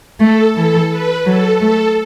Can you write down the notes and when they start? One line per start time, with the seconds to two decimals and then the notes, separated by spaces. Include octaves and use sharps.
0.20 A3 A4
0.55 E3 A4
0.90 B4
1.26 F#3 A4
1.60 A3 A4